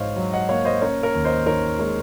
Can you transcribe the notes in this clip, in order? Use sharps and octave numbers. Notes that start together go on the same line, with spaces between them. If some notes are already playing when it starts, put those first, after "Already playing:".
Already playing: G#2 D#4 C5 C#5 D#5 F5
F#3
D#5 F#5
A#3 C#5 F5
C5 D#5
C#4 A#4 C#5
A#4 C#5
D#2
C5 D#5
D#3 A#4 C#5
G#3 A#4 C#5